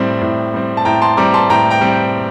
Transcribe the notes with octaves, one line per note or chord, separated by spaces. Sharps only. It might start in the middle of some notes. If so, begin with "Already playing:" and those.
Already playing: A2 G3 C4
A2
G3 C4
A5
A2 G5 A#5
A5 C6
G3 C4 A#5 D6
A5 C6
A2 G5 A#5
G5 A#5
G3 C4